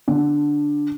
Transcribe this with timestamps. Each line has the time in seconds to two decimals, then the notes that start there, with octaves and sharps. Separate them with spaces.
0.08 D3